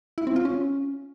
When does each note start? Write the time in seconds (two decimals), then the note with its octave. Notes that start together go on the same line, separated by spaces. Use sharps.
0.18 E4
0.27 C4
0.36 F4
0.45 C#4